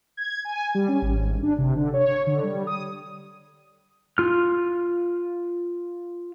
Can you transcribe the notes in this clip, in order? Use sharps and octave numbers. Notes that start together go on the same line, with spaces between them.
G#6
G#5
G3
C#4
G#1
D4
C3
D3
C#5
D3
G3
D#6
F4 F6